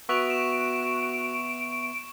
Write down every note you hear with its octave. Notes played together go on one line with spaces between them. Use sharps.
B3 F#4 E5 C#6 F#6 D7 F7
E7